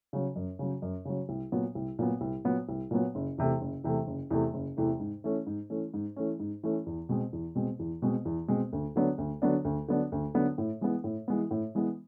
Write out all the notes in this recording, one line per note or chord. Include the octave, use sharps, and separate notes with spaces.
C#3 F#3
F#2
C#3 F#3
F#2
C#3 F#3
C2
A#2 F#3 B3
C2
A#2 F#3 B3
C2
A#2 F#3 B3
C2
A#2 F#3 B3
F#1
E2 C3 E3 A3
F#1
E2 C3 E3 A3
F#1
E2 C3 E3 A3
F#1
E2 C3 E3 A3
G#2
E3 A3 C#4
G#2
E3 A3 C#4
G#2
E3 A3 C#4
G#2
E3 A3 C#4
E2
B2 G#3 C4
E2
B2 G#3 C4
E2
B2 G#3 C4
E2
B2 G#3 C4
D2
D3 F#3 B3 D4
D2
D3 F#3 B3 D4
D2
D3 F#3 B3 D4
D2
D3 F#3 B3 D4
A2
E3 G#3 B3
A2
E3 G#3 B3
A2
E3 G#3 B3